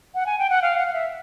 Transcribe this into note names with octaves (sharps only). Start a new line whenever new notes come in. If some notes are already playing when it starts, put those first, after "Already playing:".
F#5
G#5
G5
F#5
F5
F#5
F5
E5